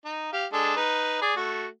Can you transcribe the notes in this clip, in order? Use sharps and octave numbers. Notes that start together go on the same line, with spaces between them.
D#4
G4 F5
G#3 D4 A4
D#4 B4
G#4 D5
A3 F#4